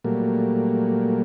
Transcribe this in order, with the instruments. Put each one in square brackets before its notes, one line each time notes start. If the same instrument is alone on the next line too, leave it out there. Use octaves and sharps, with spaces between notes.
[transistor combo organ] A#2 F#3 G3 A3 A#3